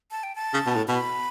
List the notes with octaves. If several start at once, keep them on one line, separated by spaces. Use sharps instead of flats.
A5
G5
A5
C#3
B2
A2
B2 B5